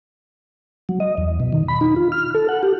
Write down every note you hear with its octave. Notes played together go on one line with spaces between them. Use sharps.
F#3
D#5
E2
B2
D#3
B5
D#4
F4
F6
A4
F#5
G4